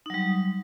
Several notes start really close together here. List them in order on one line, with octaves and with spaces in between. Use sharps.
D#4 F#3 G3